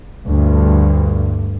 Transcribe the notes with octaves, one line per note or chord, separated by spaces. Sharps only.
D2 G2